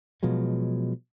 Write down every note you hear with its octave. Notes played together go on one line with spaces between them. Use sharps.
B2 F3 F#3 G#3